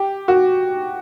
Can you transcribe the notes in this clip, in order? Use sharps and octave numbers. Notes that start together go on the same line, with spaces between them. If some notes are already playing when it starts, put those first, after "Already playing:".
Already playing: G4
F#4